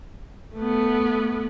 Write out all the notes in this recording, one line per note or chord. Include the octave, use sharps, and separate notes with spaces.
A3 B3